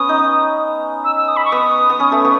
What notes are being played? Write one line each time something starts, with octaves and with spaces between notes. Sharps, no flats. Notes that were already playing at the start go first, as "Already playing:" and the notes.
Already playing: B3 C#4 D#6
D#4
E6
E6
D#6
B5
C#6
B3 D#6
B3
C#4
A3
B3